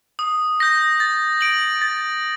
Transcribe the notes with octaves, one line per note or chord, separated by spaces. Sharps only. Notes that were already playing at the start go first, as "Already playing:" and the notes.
D#6
G6 A#6
A6
D7 F#7
A6